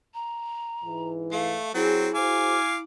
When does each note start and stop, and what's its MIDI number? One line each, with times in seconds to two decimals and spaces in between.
0.14 1.09 82
0.83 1.55 44
0.83 1.55 52
1.32 1.70 57
1.32 1.70 77
1.75 2.08 54
1.75 2.08 60
1.75 2.83 64
1.75 2.13 68
2.15 2.57 66
2.15 2.57 68
2.15 2.57 72
2.15 2.78 77
2.15 2.78 80
2.15 2.78 86